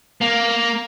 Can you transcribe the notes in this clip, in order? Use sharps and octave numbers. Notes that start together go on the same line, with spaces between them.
A#3